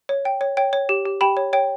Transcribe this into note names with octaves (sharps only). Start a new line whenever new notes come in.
C#5
G5
C#5
C#5 G5
C#5
G4
G4
G4 G5 B5
C#5
C#5 G5